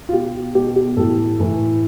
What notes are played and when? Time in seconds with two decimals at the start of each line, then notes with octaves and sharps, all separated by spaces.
0.09 F4
0.12 B2 G4
0.55 B2 G4
0.76 G4
0.96 A2 E3 A4
1.40 A2 E3